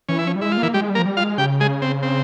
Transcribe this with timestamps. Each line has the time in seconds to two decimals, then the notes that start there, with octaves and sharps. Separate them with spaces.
0.09 E3 C#4
0.18 E4
0.25 F3 C#4
0.36 G3
0.41 G#3 E4
0.52 F4
0.58 A#3
0.63 E3 E4
0.74 G3 G#3 G4
0.90 G3
0.95 A#3 A#4
0.99 F3
1.06 G3
1.17 F4 F5
1.22 G#3
1.38 C#3 G4 G5
1.60 G#3 G#4
1.82 C4
2.03 C4